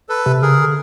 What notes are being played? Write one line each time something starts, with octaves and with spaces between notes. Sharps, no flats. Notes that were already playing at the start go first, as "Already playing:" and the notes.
A4 B4
C3
C#3 G#4 A#4
D3